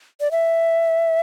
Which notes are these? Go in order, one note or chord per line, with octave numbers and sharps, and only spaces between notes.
D5
E5